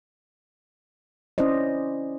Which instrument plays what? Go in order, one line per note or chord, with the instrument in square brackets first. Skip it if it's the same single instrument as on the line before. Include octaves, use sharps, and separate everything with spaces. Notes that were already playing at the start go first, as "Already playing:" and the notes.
[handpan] C#4 E4 C5 D5 D#5